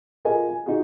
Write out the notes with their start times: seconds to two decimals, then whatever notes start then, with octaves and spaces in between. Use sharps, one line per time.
0.25 F4 G#4 A#4 D#5 G#5
0.49 G#5
0.66 D#4 F4 F#4 G#4